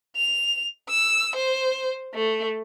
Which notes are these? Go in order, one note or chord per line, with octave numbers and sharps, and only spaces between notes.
F7
E6
C5
A3